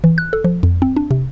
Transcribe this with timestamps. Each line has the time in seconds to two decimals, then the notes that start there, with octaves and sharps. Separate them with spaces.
0.04 E3
0.18 F#6
0.33 A4
0.44 F3
0.63 F2
0.82 C4
0.96 D4
1.11 C3